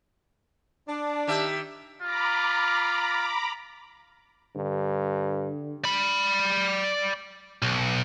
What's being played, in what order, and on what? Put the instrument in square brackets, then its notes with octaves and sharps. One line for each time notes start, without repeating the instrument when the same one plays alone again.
[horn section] D4
[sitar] D#3 G4 E5
[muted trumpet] F4 [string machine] A#5 B5 D6
[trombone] G2 [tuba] D3
[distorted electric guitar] D5 B5
B1